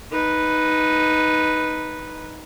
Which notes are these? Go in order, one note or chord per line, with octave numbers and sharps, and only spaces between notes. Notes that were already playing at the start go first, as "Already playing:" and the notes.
D#4 B4